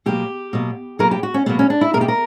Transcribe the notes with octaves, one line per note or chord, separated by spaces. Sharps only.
B2 F#3 A#3 G4
B2 F#3 A#3
B2 F#3 A#3 A#4
G4
F#4
C#4
B2 F#3 A#3 B3
C#4
D4
E4
B2 A#3 G4 A#4
A#4